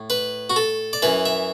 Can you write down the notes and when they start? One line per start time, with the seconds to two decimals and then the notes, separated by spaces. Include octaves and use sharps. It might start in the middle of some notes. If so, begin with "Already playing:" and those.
Already playing: A2
0.10 B4
0.50 F#4
0.56 A4
0.93 D5
1.02 F#2 E3 B4
1.26 E5